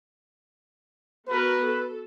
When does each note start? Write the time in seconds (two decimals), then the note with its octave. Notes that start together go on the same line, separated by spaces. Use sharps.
1.28 B3 F#4 A#4 B4
1.64 A4